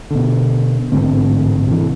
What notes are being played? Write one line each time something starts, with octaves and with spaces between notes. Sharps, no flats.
B2 D3
A1 G#2 D3 C4
C3 E3